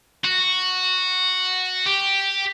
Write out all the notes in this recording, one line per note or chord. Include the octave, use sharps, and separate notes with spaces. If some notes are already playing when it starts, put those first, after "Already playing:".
F#4
G4